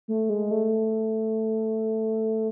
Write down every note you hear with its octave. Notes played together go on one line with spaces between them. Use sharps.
A3
G#3
A3